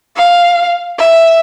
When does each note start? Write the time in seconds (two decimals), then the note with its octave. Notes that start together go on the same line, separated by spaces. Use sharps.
0.16 F5
0.98 E5